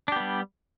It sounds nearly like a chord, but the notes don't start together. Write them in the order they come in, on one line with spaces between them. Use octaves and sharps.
D4 G4 B3 G3